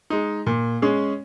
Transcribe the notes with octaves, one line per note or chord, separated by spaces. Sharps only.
G#3 D#4
A#2
G#3 C#4 G#4